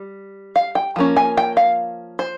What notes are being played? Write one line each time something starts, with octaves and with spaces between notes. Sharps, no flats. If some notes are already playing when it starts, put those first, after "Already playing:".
Already playing: G3
F5
G5
F3 A#3 C#4
G#5
G5
F5
C5